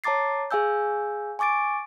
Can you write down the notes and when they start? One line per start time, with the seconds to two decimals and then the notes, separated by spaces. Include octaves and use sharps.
0.04 C#5 A5 A#5 D6 A6 C7
0.51 G#4 F5 G#5 E6 G6
1.39 G#5 C#6 D6 A6 D7